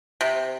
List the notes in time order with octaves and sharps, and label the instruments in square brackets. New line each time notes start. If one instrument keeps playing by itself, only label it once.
[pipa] C3